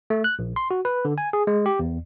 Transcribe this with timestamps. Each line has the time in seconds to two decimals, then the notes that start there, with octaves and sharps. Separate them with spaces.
0.10 A3
0.24 F#6
0.39 A#1
0.56 C6
0.71 F#4
0.85 B4
1.05 D3
1.18 G#5
1.33 G#4
1.47 G#3
1.66 G4
1.79 E2